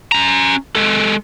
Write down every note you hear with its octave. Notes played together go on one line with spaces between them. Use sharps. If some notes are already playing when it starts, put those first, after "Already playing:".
C#4 A#5
G#3 A4